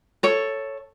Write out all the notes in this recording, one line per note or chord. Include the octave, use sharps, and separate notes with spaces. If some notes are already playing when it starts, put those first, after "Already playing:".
A4 C#5